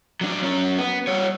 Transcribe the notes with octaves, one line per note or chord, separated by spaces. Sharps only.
F#3 D4
F#3 C#4
B3
G3 C#5